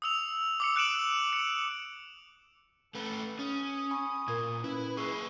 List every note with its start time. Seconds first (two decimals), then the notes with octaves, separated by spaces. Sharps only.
0.02 D#6 E6 F7
0.60 D6 E6 C#7
0.75 D6 F#6 C#7 D7 E7 F#7
1.33 C#7
2.95 A3 A4 B4
3.39 C#4 D#6
3.91 G#5 B5 C#6
4.28 A#2 A#4 G#6
4.64 C#4 E4 B4
4.97 A#3 G#4 C#6 E6 C7